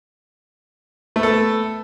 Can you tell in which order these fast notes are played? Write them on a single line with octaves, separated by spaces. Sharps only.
A3 B3 A4